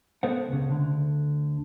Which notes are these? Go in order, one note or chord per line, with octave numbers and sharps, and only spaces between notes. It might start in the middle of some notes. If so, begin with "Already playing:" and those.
B3 A4 B4 C5 F#5
C#2 C#3
D2 D3